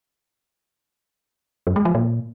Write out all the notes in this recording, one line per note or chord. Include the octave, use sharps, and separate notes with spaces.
F#2
G#3
F3
A#2